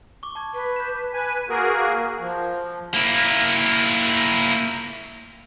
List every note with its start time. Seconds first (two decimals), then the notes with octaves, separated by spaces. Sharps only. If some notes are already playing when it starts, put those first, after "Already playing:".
0.23 C#6 D6
0.35 A5 D6 G#6
0.54 B4
0.76 G6 E7
1.14 B4 G#5
1.49 A#3 F#4 G#4 A#4
2.21 F3
2.95 A#3 E4